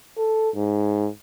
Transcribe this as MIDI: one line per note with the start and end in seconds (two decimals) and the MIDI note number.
0.18 0.50 69
0.55 1.08 44